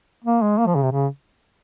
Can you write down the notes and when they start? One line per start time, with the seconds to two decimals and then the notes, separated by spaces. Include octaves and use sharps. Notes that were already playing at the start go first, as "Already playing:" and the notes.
0.25 A#3
0.42 G#3
0.58 A#3
0.67 F3
0.75 C#3
0.83 C3
0.92 C#3